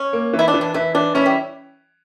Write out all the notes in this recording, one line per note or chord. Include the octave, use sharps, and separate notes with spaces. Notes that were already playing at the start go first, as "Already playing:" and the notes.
Already playing: C#4
A#3
E3
E4
D4
E3
D4
E3 E4
E3 D4
C#4 E4
G3